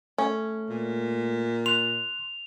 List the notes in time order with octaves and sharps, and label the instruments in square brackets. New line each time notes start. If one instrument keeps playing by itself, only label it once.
[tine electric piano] A3 [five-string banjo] C#4
[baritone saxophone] A#2
[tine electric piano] C6 F#6 [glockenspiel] F7